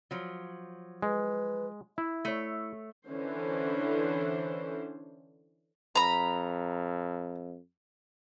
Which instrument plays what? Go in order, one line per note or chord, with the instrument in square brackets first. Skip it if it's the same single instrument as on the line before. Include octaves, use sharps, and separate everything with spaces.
[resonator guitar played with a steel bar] F3 F#3
[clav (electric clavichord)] G#3 [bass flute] B4
[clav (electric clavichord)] E4 [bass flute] E5
[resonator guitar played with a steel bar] A3 C#5
[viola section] D3 E3 C#4 D4 C5
[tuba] F2 [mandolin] A#5 B5